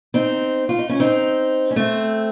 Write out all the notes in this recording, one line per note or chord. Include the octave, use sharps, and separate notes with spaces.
C4 D#4
F4
D#4
C#4
C4 D#4
C#4
A3 C4